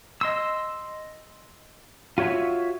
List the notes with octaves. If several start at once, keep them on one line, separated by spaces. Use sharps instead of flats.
D#5 C6 E6
F4 F#4 C#5 E5